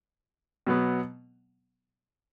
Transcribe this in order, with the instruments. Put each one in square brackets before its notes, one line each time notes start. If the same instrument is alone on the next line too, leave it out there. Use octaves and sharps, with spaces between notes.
[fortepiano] B2 F#3 B3